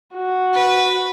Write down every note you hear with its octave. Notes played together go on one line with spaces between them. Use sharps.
F#4
B4